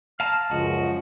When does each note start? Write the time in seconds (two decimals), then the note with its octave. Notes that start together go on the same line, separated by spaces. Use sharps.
0.20 F5 A5 A#5 F6
0.51 C#2 F#2 F3 F#4 D#5